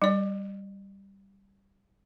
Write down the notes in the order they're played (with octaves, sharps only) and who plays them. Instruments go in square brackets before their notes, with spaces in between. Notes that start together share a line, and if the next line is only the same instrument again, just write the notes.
[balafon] G3 D5